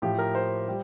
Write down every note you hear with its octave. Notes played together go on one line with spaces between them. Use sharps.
A2 F3 G4
A#4
C5
G3